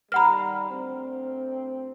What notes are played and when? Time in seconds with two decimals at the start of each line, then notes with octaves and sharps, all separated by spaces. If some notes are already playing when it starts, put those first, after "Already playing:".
0.12 D#3 G3 B4 F#5 A#5 B5 F6
0.70 D2 C4